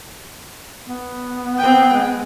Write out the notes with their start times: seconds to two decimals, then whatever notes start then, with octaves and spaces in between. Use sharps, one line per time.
0.86 B3
1.58 C4 G5
1.93 G#3